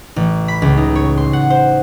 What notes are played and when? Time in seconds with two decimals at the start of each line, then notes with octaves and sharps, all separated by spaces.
0.16 A1
0.48 B5
0.62 C#2
0.77 D#4
0.96 C#5
1.17 C6
1.33 F#5
1.50 C5